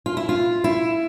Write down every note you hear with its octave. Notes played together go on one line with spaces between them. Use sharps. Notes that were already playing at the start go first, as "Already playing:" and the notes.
F4
E4
F4
E4